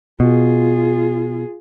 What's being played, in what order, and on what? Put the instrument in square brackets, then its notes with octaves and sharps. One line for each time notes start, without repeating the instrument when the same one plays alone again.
[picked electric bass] B2 [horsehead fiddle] F4 G#4